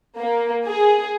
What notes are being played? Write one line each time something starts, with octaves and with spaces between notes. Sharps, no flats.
A#3
G#4